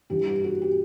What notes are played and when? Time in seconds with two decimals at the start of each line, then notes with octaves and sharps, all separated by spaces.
0.10 G2 E3 G4
0.27 G4
0.44 F#4
0.62 G4